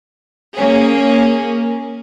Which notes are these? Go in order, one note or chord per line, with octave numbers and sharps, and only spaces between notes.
A#3 C#4 G#4